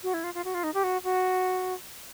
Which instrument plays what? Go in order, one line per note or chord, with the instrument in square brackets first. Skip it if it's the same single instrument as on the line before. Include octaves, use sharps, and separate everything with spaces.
[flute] F#4
E4
F4
F4
F#4
F4
D#4
G4
F#4
F#4